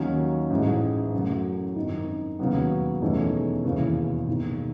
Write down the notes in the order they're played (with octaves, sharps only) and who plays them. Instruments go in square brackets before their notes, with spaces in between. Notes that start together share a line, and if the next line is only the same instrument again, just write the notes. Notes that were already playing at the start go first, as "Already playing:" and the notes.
Already playing: [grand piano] D#2 D#3 F#3 C#4
A1 G#2 E3 G#3
F#2 C#3 F#3 A3
G#1 F#2 D#3
E1 D#2 C#3 F#3 B3
E1 E2 D#3 A3 C#4
E1 D#2 C#3 E3
E1 D#2 D#3